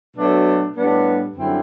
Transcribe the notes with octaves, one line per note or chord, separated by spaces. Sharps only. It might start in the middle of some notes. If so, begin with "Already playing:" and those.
B2 F#3 A3 D4
A2 G3 B3 D4
F#2 D3 G3 C4 E4